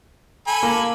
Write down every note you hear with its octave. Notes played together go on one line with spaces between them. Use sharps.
A4 G#5 B5
A#3